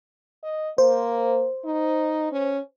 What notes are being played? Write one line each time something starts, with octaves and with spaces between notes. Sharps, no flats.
D#5
A#3 C5
D#4
C#4